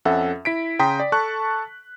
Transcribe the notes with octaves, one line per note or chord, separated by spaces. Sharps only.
F2 C#4 A4 E5 F#5
E4 B6 D7
C#3 G5 A#5 C6 D#6 B6
D5
A4 A5 C#6 F#6